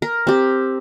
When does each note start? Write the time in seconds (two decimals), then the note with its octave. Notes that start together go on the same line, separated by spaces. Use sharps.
0.02 A#4
0.27 C4 G4